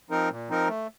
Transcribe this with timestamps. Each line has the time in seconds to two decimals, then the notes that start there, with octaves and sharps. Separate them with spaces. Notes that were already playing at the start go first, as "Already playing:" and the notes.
0.10 F3 C4 D#4 A#4
0.30 A#2
0.49 F3 C4 D#4 A#4
0.68 A3